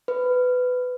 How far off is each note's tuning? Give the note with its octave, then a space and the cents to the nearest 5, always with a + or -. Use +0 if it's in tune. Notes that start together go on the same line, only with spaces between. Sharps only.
B4 +15